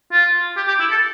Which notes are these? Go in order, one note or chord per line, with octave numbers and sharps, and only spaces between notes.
F4
G4
G4
E4
A4